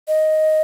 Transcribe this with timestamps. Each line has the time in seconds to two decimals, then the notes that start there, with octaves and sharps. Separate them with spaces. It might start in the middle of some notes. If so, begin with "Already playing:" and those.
0.08 D#5